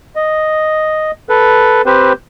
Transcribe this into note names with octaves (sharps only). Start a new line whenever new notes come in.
D#5
A4 B4
C4 G4 B4 C5